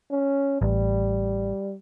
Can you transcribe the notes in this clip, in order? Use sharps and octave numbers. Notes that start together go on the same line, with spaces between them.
C#4
A1 G3